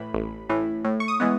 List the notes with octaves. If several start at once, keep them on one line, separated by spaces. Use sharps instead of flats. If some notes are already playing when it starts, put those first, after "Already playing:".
Already playing: A2 E3 B5
A1
A2 E3
A2
C#6
D#6
E3 G#3 B3